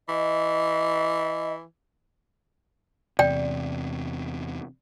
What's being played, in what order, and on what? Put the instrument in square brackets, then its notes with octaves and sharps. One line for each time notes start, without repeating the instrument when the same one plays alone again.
[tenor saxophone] E3 [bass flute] D#5
[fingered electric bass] E2 C3 [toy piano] D5 G5